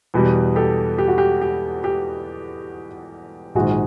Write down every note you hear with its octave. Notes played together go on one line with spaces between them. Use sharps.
E2 B2 G3
G4 A4
G4
F#4
G4
G4
G4
A#1 G#2 D#3 F#4 G#4